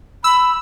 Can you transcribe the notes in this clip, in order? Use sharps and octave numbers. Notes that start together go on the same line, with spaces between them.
B5 E6